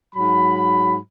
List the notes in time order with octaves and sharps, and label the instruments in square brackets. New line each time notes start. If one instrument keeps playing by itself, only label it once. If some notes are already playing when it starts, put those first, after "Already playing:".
[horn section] G#2 F#3 B5